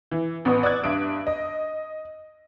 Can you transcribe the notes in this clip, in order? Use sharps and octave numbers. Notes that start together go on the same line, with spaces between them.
E3
A1 B3 B4 C#6 D#6
D5 D#6 E6 F#6 G#6
G2 E5 D#6 D7
D#5